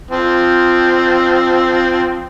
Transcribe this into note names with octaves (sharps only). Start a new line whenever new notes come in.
F3 C4